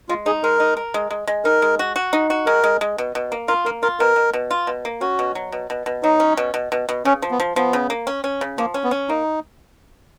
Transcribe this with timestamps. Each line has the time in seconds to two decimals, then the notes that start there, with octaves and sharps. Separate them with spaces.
0.09 G#3 F4
0.26 D#4 G#4
0.43 G#3 A#4
0.60 D#4
0.77 A#4
0.94 G#3
1.11 G#3
1.27 G#3
1.45 D#4 A#4
1.62 G#3
1.79 F#4
1.96 F#4
2.13 D#4
2.30 F#4
2.46 G#3 A#4
2.64 G#3
2.81 G#3
2.98 B2
3.15 B2
3.32 A#3
3.48 F4 A#4
3.65 A#3 A#4
3.83 F4 A#4
4.00 B2 A#4
4.16 B2
4.33 B2
4.51 F4
4.67 B2
4.85 A#3
5.01 C#4 F#4
5.19 B2
5.35 F#3
5.52 B2
5.70 B2
5.86 B2
6.03 F#3 D#4
6.20 C#4
6.37 B2
6.54 B2
6.72 B2
6.89 B2
7.05 C#3 C#4
7.22 F3
7.31 B3
7.40 F3
7.56 F3 B3
7.73 C#3
7.90 A#3
8.07 C#4
8.24 C#4
8.41 C#3
8.58 F3 A#3
8.74 C#4
8.84 B3
8.91 C#4
9.09 A#3 D#4